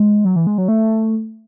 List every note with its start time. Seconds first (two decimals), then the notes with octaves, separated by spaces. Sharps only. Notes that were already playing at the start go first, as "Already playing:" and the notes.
Already playing: G#3
0.25 F#3
0.36 E3
0.47 G#3
0.58 F#3
0.68 A3